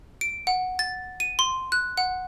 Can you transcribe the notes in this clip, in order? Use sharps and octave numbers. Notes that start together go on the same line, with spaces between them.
D7
F#5
A6
D#7
C6
F#6
F#5